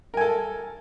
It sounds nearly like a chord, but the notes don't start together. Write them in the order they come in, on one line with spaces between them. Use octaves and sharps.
A#4 G#5 A4